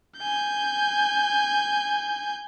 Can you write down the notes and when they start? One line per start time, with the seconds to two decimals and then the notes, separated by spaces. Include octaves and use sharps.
0.18 G#5 G6